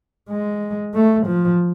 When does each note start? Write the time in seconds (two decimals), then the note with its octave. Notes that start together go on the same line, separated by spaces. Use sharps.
0.29 G#3
0.94 A3
1.27 F3